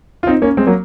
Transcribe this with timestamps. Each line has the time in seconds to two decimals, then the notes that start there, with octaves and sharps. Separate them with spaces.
0.23 F4
0.27 C4 D#4
0.42 A#3 C#4
0.57 G#3 C4
0.67 F#3 A#3